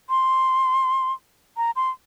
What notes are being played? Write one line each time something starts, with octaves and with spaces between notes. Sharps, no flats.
C6
A#5
C6